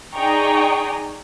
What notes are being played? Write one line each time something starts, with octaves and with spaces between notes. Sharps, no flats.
D#4 G#4 D5 G5 A#5 C#6